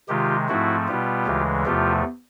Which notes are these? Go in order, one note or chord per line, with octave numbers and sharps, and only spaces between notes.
C3 D#3 G#3 F4 G4
G#2 F3 A3 C4 E4 F#4
B2 G3 B3 F4 G4
D2 C#3 E3 G#3
E2 C3 F3 A3 F4 G4